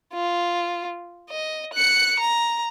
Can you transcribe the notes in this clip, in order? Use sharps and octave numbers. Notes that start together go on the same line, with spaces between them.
F4
D#5
F#6 C#7
A#5